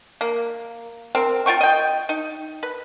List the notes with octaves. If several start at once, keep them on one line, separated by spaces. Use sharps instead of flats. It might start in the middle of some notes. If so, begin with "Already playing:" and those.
A#3
C4 A#4
F4 C5 G5 C#6
D#5 G5
D#4
B4